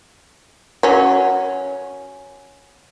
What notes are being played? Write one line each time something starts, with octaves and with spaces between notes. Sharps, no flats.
F#3 C#4